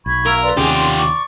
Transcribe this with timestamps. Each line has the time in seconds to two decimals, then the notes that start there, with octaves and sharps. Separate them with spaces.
0.06 B1 B5 C#6 G#6
0.26 A#4 E5 F5
0.43 B4 D5 C6
0.57 D#2 C3 C#4 F4 G4 G#4 C5 D5
0.70 C6
0.98 C#6 D6